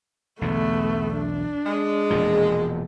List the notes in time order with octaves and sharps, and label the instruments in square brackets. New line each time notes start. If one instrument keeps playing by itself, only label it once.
[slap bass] B1 E2 D3 [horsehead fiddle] A3 B3
[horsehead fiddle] D4
[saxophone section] G#3
[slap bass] E1 A#2 F3